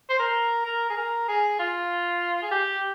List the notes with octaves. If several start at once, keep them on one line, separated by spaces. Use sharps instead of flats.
C5
A#4
A#4
G#4
A#4
G#4
F4
G#4
G4